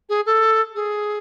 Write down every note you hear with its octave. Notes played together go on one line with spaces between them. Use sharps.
G#4
A4
G#4